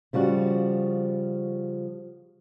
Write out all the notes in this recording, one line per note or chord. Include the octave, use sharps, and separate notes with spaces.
C#3 F3 G3 F#4